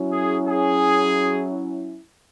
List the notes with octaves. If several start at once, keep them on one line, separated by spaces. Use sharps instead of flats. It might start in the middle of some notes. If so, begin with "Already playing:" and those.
Already playing: F#3 C#4 E4
G#4
G#4